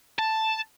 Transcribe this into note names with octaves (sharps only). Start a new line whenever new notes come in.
A5